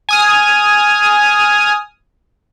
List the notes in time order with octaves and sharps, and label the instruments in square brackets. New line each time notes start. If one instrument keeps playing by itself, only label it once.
[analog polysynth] G#5 D#6 F6